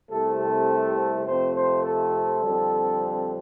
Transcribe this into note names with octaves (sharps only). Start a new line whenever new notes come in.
C2 C3 A3 C4 A4
A4
F2 C3 A3 C4 C5
C5
A4
F2 D3 G3 C4